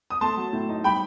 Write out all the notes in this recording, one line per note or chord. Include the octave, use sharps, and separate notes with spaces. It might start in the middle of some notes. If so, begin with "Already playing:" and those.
D#6
A3 A5 C6
F#3
A2
D#4
G3 G5 B5